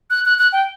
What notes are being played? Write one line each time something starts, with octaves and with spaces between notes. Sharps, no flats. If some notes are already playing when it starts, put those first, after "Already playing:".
F#6
F#6
F#6
G5